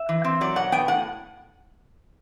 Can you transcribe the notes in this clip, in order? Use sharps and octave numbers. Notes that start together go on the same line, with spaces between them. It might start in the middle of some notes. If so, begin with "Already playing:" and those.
Already playing: E5
E3
C4
F#3 D5
B2 F#5
B3 G5
A2 F#5